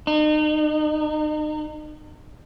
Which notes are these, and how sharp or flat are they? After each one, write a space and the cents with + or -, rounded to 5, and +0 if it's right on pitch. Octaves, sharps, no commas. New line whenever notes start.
D#4 -35